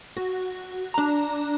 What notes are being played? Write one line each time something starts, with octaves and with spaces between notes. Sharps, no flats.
F#4
D4 A#5